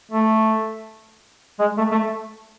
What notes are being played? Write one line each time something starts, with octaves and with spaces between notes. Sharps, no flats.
A3
G#3
A3
A3